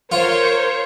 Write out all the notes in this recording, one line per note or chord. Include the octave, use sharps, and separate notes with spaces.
F4 A#4 C5 C#5